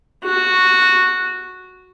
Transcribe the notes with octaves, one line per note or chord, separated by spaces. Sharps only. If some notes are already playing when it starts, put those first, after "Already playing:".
F#4